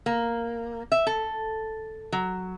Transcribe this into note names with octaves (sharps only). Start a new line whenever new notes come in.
A#3
E5
A4
F#3